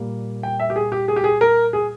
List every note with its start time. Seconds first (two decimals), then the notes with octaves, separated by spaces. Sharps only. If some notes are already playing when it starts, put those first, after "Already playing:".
Already playing: A#2 G3 A#3
0.43 G5
0.60 E5
0.70 G4
0.76 G#4
0.92 G4
1.08 G#4
1.16 G4
1.24 G#4
1.41 A#4
1.73 G#4